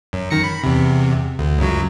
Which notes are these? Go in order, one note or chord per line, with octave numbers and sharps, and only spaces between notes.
F#2
D#3 A#6 C#7
B5
E2 C3
D2
C#2 F#2 F#3